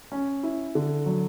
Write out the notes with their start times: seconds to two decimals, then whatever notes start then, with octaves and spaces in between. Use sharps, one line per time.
0.12 C#4
0.43 E4
0.75 D3
1.06 F#3